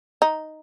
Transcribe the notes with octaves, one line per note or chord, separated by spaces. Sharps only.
D#4